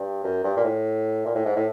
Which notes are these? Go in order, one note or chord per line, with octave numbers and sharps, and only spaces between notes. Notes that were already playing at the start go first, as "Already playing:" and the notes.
Already playing: G2
F#2
G2
A#2
A2
A#2
A2
G#2
A2